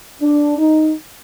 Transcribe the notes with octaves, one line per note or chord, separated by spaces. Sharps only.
D4
D#4